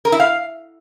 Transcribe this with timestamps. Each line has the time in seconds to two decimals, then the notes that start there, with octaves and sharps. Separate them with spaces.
0.05 A#4
0.12 E4
0.20 F5